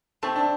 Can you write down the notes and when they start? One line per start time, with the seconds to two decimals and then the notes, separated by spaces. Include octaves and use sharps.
0.23 A3 C4
0.36 D4